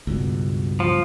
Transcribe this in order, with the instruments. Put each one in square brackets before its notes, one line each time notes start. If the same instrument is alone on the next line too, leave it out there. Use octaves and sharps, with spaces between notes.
[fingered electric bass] C#2 G2 B2
[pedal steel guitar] F3